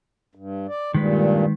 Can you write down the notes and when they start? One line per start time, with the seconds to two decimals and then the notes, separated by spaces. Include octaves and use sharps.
0.35 G2
0.69 D5
0.94 G2 A#2 D#3 G#3 B4